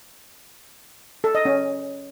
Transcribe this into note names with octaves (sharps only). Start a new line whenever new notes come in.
A4
D#5
C#4